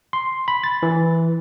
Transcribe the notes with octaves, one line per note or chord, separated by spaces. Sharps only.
C6
B5
A6
E3